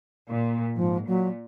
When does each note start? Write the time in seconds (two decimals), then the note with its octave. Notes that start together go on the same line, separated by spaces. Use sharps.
0.28 A#2
0.75 G#2 F3
1.07 A#2 F#3